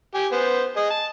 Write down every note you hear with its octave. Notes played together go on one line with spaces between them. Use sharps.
G4 G#5
B3 C5
G#4 D#5
A5